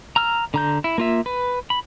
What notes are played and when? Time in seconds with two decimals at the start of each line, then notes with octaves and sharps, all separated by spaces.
0.16 A#5 E6 F6
0.54 D3 A#5 G6
0.84 E4
0.98 A#3 F4 E5
1.26 B4
1.70 B5